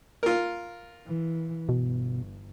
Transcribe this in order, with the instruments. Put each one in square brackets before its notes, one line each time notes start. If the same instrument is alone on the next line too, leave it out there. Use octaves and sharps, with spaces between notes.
[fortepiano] F4 A#4
[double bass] E3
[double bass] G1 [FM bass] B2